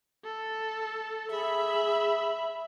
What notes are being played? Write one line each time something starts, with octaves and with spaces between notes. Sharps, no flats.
A4
G#4 E5 B5